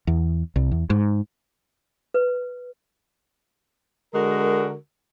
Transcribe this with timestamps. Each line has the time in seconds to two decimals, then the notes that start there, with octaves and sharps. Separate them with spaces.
0.07 E2
0.56 C2
0.72 E2
0.90 G#2
2.14 B4
4.14 D3 G#3 F#4 A#4